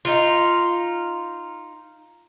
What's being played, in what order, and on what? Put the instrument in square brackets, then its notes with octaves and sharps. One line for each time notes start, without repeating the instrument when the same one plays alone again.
[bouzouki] D#4 F4